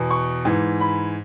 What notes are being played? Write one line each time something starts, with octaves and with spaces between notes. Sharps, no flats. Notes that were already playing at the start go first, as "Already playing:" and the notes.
Already playing: E2 B2
C#6
G#2 E3
B5